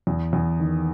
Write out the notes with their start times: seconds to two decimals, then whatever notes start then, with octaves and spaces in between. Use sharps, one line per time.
0.07 E2
0.33 E2
0.60 D#3